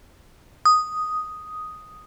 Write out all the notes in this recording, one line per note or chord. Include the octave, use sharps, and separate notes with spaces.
D#6